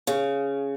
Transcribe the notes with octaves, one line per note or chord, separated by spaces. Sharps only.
C#3